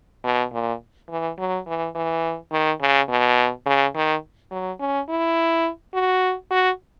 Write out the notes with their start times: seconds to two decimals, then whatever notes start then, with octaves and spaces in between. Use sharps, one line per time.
0.24 B2
0.53 A#2
1.09 E3
1.39 F#3
1.67 E3
1.95 E3
2.52 D#3
2.81 C#3
3.09 B2
3.66 C#3
3.95 D#3
4.51 F#3
4.80 C#4
5.09 E4
5.94 F#4
6.51 F#4